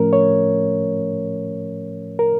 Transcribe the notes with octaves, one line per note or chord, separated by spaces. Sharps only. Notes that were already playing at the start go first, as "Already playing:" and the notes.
Already playing: A2 F3 A3 C#4 A#4
C#5
A#4